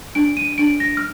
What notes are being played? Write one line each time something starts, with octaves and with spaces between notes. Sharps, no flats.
D4 D7
D#7
D4 D7
A#6
F6